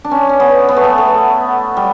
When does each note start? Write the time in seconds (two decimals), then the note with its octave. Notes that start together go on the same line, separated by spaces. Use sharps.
0.04 D4
0.11 C#4
0.29 C#4
0.40 B3
0.69 B3
0.76 A3
0.84 B3
0.98 A3
1.77 G3